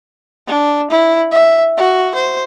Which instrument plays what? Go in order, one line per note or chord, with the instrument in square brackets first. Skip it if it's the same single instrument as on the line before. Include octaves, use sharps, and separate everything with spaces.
[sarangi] D4
E4
E5
F#4
C5